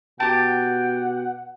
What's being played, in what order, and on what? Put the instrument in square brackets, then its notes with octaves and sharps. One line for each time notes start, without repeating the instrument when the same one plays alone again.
[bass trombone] B2 [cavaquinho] G4 A5 [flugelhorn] F#5 [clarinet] G5